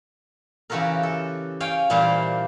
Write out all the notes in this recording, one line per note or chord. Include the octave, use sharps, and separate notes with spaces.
C#3 E3 F#4 G4 A4 A#4
A4
C#5 F5 G5 G#5
A#2 E3 G3 G4 C5 F5